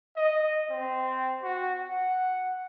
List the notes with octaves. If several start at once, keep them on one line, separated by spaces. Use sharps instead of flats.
D#5
C4
F#4
F#5